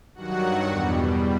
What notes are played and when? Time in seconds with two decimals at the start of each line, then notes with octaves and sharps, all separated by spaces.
0.15 G2 D#3 F#3 F#4 F#5
0.68 E2 B2 G3